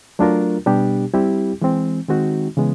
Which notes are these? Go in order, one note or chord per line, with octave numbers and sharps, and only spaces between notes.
F#3 A3 D4 F4 A#4
B2 G3 B3 D4 G4
G3 C4 E4 G4
E3 G#3 C4
D#3 G#3 C4 D#4 F#4
C#3 E3 G#3 B3